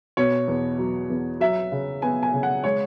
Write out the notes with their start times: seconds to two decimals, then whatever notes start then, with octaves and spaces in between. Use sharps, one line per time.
0.17 B2 C#5
0.48 E2
0.79 F#3
1.10 E2
1.40 F#3 E5
1.72 C#3
2.02 B3 G#5
2.23 G#5
2.33 C#3
2.43 F#5
2.64 G#3 C#5